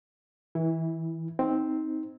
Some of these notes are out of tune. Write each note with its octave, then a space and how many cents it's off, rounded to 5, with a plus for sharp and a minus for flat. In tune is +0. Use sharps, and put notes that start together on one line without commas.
E3 -25 E4 +0
C4 +0 D#4 +15